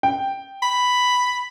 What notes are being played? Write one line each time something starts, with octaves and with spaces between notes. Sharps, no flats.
G5
B5